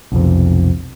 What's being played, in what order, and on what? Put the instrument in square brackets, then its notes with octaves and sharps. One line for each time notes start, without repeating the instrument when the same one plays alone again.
[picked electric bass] B1 F2 C3